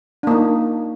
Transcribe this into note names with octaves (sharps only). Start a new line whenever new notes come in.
A#3 D4 D#4